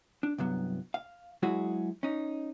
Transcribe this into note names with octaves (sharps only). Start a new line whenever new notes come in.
D4
C2 G2 F#3 B3
F5
F#3 G#3 E4 F#4 G#4
C#4 D#4